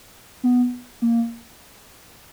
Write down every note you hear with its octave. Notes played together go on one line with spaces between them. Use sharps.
B3
A#3